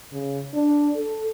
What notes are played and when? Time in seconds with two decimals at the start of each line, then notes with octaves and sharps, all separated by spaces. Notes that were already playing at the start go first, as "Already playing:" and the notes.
0.13 C#3
0.54 D4
0.96 A4